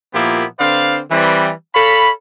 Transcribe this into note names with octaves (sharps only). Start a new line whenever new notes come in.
A#2 F3 A#3 B3 E4 G4
D3 C4 B4 C5 D5 F5
E3 G3 C4
A4 C#5 F5 B5